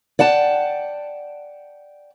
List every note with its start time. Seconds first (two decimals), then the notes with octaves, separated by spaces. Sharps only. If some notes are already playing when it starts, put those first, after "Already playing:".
0.19 D5 F#5 G5 A5